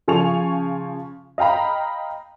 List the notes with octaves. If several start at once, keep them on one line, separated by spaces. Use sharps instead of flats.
C#3 F3 G#5 C#6 F7
D#5 F5 G5 A#5 B5